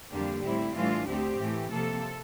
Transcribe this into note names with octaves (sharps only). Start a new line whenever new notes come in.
F2 D3 G3 A#3 D4 G4
A2 G3 C4 E4
A2 E3 G3 D4 F4
D2 D3 A3 C4 G4
A2 E3 A3
C3 F3 A#3 A4